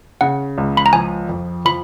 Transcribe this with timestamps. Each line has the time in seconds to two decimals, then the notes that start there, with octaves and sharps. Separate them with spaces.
0.21 C#3 F#5
0.58 C#2
0.77 B5
0.86 A#5
0.93 F3 G#5
1.29 F2
1.65 F3 B5